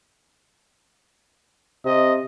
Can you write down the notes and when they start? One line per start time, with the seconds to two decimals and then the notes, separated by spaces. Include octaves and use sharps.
1.85 C3 D#5